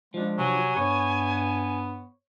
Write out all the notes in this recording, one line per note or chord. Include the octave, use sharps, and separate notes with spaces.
F3 G#3 D4
C3 F#3 G#5
G2 B3 C#5